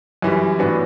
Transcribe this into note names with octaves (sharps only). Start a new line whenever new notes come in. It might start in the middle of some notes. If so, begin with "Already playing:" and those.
F#2 E3 G3
A2 E3 B3 D4 F#4